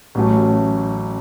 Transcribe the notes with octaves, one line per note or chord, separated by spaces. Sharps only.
A1 A2 F#3 A3 C#4